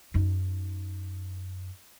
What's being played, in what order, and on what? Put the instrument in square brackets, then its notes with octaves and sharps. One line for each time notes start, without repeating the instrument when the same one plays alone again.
[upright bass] F#2 D#4